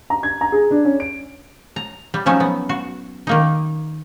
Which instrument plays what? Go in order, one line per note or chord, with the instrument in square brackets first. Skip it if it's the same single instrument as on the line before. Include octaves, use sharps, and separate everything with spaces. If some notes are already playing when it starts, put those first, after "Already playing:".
[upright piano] A#5
G#6
A#5
G#4
D4
C#4
D7
[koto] A#5
G3
F3 F#3 C#4 D#4
B3
F#4
D#3 A#3 D#4